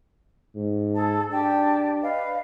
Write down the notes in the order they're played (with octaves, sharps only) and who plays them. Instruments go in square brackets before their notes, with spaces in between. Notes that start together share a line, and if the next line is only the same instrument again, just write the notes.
[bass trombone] G#2
[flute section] G#4 A4 A5
[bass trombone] D4 [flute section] G4 G5 A5
[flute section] B4 D#5 F5